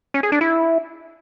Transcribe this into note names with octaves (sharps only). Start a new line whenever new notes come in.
C#4
G#4
D4
E4